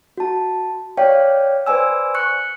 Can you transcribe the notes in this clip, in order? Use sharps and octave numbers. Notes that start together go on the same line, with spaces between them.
F#4 A5
C#5 D5 F5 G5
B4 C5 D5 G#5 E6
C#6 F#6 C#7